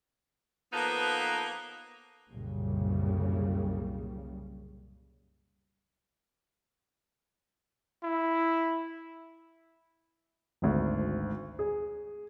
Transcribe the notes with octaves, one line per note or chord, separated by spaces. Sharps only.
F3 A#3 B3 D#4 A4 B4
C2 F#2 A#2 C#3 G3
E4
G#1 D2
G#4